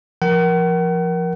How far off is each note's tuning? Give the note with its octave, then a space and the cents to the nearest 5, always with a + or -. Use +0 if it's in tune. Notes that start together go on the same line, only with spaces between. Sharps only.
F3 -15 A#4 +15 F#5 +40